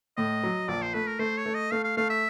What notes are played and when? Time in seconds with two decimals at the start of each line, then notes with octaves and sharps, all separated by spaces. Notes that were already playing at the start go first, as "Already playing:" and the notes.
0.17 A2 D#5
0.43 F#3
0.68 A#1 D5
0.82 C5
0.94 A3 B4
1.07 A#4
1.19 A3 C5
1.37 C#5
1.46 A3
1.54 D#5
1.71 A3 F5
1.84 F5
1.97 A3 F5
2.10 E5